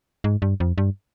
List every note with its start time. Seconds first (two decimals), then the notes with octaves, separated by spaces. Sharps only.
0.24 G#2
0.42 G2
0.60 F2
0.78 G2